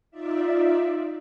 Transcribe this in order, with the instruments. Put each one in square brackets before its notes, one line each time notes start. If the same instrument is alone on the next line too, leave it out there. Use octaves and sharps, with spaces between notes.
[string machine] D#4 F4 D5 E5